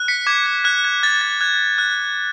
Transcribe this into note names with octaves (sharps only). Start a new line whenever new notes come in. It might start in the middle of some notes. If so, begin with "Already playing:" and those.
Already playing: F#6
B6 C#7
D6 G#6
G#6
F#6 G#6
G#6
F#6 A6
A6
F#6 G#6
F#6